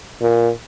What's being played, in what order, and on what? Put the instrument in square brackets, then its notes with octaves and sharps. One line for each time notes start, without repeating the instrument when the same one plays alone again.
[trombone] A#2